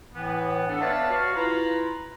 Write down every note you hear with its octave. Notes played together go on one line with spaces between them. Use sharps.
A2 E3 B3
B3 D4 A4
B4 C#5 D5 E5 F5 A5
F#4 F5
E4 F4 B4 A#5